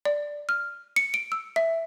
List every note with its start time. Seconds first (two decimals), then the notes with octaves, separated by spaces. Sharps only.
0.05 D5
0.49 F6
0.96 C#7
1.14 D7
1.32 E6
1.56 E5